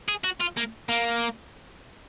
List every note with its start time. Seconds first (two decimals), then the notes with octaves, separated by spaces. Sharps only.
0.09 G#4
0.24 F#4
0.41 F4
0.57 A#3
0.89 A#3